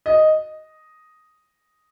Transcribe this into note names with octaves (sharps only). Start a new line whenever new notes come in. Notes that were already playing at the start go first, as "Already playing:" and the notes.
D#5